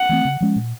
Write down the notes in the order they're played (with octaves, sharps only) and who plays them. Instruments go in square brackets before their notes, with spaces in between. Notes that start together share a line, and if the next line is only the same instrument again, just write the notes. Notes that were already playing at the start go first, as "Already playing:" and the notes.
Already playing: [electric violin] F#5
[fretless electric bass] E3 A3 C4
C#3
F3 G#3 C#4
A#2